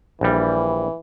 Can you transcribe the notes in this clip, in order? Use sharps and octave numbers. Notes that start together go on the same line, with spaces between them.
A#1 E3 G3